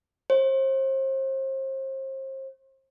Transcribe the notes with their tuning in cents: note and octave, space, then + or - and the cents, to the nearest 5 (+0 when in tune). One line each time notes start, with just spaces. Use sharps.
C5 +35